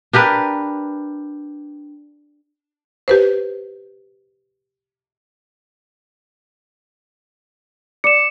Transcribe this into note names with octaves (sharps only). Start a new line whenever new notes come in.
D4 G4 A#4 B4
G4 B4 C5
D5 C#7 E7